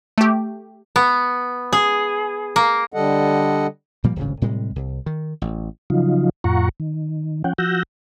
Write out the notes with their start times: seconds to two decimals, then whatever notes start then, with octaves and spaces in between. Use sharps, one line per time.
0.18 A3 G4
0.96 B3
1.73 G#4
2.56 A#3
2.94 D3 G3 A4 D#5 F#5
4.04 A#2 F3 G3 A#3
4.16 D1 G#1 G2 C#3
4.42 A2 C3 G3 G#3
4.76 C2
5.06 D#3
5.42 A1
5.90 C#3 F3 F#3 D#4 F4
6.44 F2 A2 F4 F#5 A#5 C#6
6.80 D#3
7.44 F3 C#4 F#5 G5
7.58 F3 F#4 E6 F#6 G6 A#6